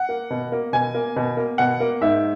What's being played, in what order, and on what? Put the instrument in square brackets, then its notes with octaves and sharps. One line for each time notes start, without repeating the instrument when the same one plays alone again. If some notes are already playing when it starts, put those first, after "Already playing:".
Already playing: [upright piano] F#5
A#3
B2
A#3
B2 G#5
A#3
B2
A#3
B2 F#5
A#3
G#2 E5